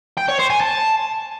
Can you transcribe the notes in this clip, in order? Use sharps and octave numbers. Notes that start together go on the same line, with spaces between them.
G5
C#5
C5
G#5
A5